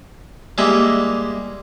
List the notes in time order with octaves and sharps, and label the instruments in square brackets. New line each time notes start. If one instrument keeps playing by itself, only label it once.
[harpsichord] G3 G#3 A#3 E4